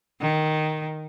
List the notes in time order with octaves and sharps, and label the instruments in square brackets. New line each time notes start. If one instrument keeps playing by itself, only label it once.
[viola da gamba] D#3